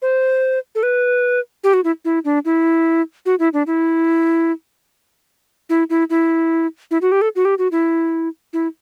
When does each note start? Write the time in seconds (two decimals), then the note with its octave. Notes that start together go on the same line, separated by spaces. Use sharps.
0.02 C5
0.75 A4
0.83 B4
1.64 G4
1.74 F#4
1.84 E4
2.05 E4
2.25 D4
2.45 E4
3.26 F#4
3.39 E4
3.53 D4
3.67 E4
5.70 E4
5.90 E4
6.10 E4
6.91 E4
7.02 F#4
7.12 G4
7.22 A4
7.36 F#4
7.45 G4
7.58 F#4
7.72 E4
8.53 E4